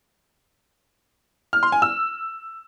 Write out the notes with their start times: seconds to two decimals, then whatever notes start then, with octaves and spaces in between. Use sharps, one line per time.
1.53 F6
1.63 C6
1.72 G#5
1.82 E6